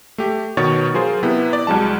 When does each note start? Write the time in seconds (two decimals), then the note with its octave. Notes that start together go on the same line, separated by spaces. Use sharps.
0.18 A3 G4
0.57 B2 D#3 B3 C#5 A6
0.94 F#3 F4 G#4 A#4 C5
1.23 C3 B3 E4
1.53 D5
1.67 C2 F#3 G#3 A5